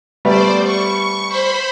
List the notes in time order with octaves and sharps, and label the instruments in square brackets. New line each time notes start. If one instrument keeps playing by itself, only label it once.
[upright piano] G3 A3 B3 [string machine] C5 D5
[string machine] C#6
C5 B5